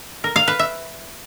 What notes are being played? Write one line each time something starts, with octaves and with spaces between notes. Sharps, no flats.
A#4
F5
B4
E5